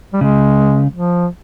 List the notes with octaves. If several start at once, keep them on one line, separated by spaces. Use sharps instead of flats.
G3
C#3 G#3
F3